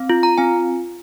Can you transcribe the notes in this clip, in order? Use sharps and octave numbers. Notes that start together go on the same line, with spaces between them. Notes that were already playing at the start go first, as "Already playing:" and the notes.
Already playing: C4
F4
A#5
C4 G#5